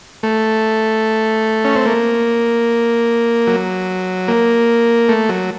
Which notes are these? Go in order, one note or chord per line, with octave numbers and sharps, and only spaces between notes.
A3
C#4
C4
A#3
F#3
A#3
A3
F#3